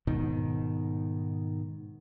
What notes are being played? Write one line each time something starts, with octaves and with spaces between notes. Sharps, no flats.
G#2 B2 D#3